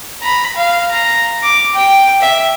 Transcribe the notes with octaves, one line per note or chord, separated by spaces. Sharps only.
A#5 B5
F5
A#5
D6
G5
E5